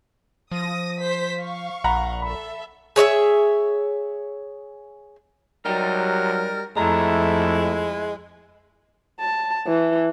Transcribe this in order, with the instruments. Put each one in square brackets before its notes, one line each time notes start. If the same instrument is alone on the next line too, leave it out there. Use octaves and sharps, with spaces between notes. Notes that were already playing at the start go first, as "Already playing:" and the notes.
[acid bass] F3 [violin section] D#6 A#6
[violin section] C5 B6
F5 C#6
[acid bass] A#1 [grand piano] F#5 A#5 B5
[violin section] A4 E5 [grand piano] B5
[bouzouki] G#4 C#5 D#5 E5
[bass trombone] F#3 [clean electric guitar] G3 D#4 G4 [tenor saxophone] A#4
[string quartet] F2 E4 [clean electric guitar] F3 A#5 [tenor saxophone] G#3 [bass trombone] A3
[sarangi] A5
E3